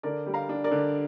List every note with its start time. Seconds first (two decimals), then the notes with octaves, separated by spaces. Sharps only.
0.03 D3 A#4 D5
0.26 G3
0.34 F5 A#5
0.49 D4
0.64 A#4 D5
0.71 D3